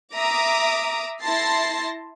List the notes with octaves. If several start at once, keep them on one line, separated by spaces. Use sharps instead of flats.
E5 A#5 D6 D#6
E4 A5 C6 A6 A#6 C7